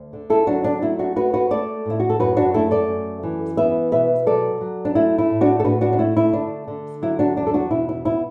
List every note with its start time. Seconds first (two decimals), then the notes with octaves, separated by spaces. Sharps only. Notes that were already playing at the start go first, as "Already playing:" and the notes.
Already playing: D2
0.13 D3
0.30 E4 A4
0.47 F#3 D4 F#4
0.64 D4
0.82 A3 E4
0.99 D4 F#4
1.16 A3 F#4 B4
1.34 F#4 B4
1.51 A3 A4 D5
1.86 A2 E4
2.00 F#4
2.10 A4
2.20 F#2 F#4 B4
2.37 D4 F#4
2.54 A3 E4 A4
2.71 A4 D5
2.88 F#2
3.23 E3
3.57 B3 B4 E5
3.92 B2 B4 E5
4.26 F#3 A4 D5
4.61 F#3
4.85 D4
4.95 A3 E4
5.18 E4
5.30 A2
5.41 D4 F#4
5.60 A4
5.64 A2 F#4 B4
5.81 D4 F#4
5.93 D4
5.99 A3 E4
6.17 E4
6.33 D3 D4
6.68 D3
7.02 F#3 E4
7.19 D4 F#4
7.37 E2 D4
7.47 A4
7.54 D4 F#4
7.71 B2 E4
7.89 E4
8.05 B3 E4